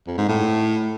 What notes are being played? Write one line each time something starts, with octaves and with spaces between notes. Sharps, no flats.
F2
G#2
A2